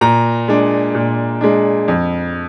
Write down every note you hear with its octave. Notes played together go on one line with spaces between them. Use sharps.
A#2 A#5
G#3 D4
A#2
G#3 D4
F2